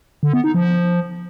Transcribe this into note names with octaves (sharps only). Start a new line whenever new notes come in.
D3
B3
D#4
F3